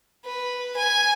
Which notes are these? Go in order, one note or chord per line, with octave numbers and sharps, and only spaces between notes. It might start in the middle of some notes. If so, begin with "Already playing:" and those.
B4
G#5